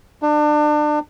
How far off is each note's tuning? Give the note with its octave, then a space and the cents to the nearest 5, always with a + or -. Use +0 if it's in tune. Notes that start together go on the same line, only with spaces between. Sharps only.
D4 +30